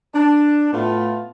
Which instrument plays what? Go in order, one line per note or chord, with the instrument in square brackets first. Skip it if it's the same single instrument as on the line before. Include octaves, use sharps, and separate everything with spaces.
[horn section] D4
A2 A3 B3 F4